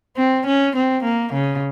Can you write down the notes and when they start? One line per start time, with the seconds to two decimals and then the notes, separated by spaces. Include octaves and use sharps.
0.17 C4
0.46 C#4
0.75 C4
1.03 A#3
1.33 C#3